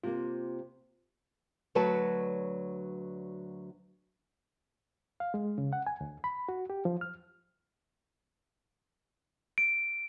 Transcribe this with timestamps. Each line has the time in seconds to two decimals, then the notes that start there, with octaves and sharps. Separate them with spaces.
0.04 C3 A#3 F4
1.75 D2 F#3 F#4 B4 C#5 A5
5.20 F5
5.34 G#3
5.58 C#3
5.73 F#5
5.87 G#5
6.01 D2
6.24 B5
6.49 F#4
6.70 G4
6.85 F3
7.01 F6
9.58 D7